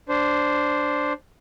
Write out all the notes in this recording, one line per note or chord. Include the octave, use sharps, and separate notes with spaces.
D4 C5